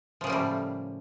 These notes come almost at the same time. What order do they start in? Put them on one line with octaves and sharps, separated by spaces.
F3 C#3 A#3 G3 A2